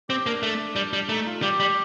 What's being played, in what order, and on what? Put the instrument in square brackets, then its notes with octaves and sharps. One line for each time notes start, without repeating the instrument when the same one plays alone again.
[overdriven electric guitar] C4 [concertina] G4
[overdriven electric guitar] A#3 [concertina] D4
[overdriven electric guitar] A3
G3
G3
[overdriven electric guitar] A3 [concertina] D#4
[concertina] F4
[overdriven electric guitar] G3 [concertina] G4
[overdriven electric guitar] G3